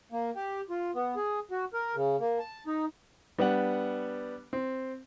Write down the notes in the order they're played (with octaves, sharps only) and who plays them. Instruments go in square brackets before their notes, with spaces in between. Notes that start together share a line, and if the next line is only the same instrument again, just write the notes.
[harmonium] A#3
G4
F4
B3
G#4
F#4
A#4
C#3
A#3
A5
D#4
[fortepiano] G3 B3 D4 F#5
C4